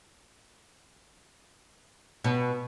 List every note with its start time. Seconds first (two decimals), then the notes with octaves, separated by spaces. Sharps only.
2.24 B2